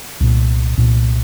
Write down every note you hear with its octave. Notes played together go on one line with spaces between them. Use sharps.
C2 A#2
C2 A#2